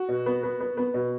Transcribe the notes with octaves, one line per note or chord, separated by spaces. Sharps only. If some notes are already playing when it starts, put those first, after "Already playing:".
Already playing: F#4
B2
B3
B3
B3
B3
B2